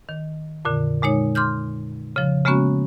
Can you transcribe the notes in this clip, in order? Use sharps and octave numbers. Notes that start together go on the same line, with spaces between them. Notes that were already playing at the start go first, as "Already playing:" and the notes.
D#3
F2 A#2 D3
A#2 G#3 D#4 C#5
C6 D6 F6 G6
C#3 F3
C#3 G#3 A#3 B3 C#4 F#4